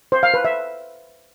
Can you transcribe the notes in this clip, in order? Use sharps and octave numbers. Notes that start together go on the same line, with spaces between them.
C5
F5
B4
E5